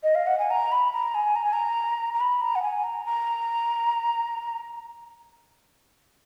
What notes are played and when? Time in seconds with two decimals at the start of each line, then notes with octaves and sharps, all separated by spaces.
0.03 D#5
0.15 F5
0.27 F#5
0.38 G#5
0.50 A#5
0.71 B5
0.92 A#5
1.14 G#5
1.35 A#5
1.44 G#5
1.53 A#5
2.13 A#5
2.20 B5
2.41 A#5
2.55 F#5
2.62 G#5
2.83 A#5
3.05 A#5